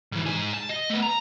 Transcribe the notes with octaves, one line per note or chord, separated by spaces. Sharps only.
G#2 E3
G#2 G#4
A5
D#5
A3 B3
A#5